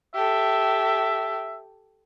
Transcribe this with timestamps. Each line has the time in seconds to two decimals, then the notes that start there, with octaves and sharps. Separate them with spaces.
0.15 G4 A4 E5